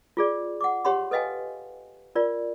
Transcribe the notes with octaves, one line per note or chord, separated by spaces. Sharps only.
F4 G#4 D5
F#5 D6
G4 C#5 F#5 B5 C6
A4 B4 D#5 F5 G5 G#5
F4 A#4 D5